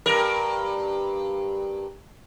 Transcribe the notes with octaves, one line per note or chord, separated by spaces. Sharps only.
G2 A#4